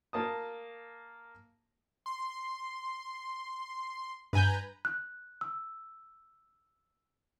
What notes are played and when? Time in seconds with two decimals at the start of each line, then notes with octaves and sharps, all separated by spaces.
0.13 A#3 A5 D#6
2.06 C6
4.33 G2 B4 G#5 A#5 B5 G6
4.85 F#6
5.41 E6